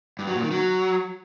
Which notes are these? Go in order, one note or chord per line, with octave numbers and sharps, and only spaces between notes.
G2
F#3
A#2
D#3
F#3